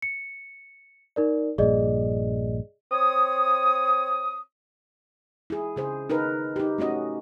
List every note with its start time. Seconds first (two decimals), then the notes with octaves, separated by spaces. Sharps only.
0.02 C#7
1.16 D#4 A#4 D5
1.58 A#1 G2 A#2 G#4 D5 D#5
2.91 C4 C#5 D#6
5.50 E4 G#4
5.76 C#3 G#4 C5
6.10 D#4 A#4 B4
6.56 D#4 G4
6.78 A3 C#4 F#4 D#5